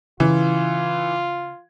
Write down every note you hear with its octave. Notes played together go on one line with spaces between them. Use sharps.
C#3 E3 F4